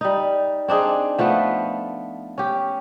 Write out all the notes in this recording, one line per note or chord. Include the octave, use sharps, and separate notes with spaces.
G3 D#4
C4 D4 D#4 G#4
F3 A3 B3 B4
C#4 G4